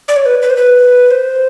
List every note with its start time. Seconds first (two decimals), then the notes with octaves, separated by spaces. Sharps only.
0.08 D5
0.16 C#5
0.25 B4
0.42 B4
0.50 C5
0.57 B4
1.11 C5